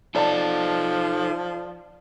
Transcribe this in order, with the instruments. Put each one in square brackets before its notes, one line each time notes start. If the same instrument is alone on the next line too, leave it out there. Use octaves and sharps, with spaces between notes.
[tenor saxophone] F3 [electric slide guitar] D#4 A4 [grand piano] D5 A5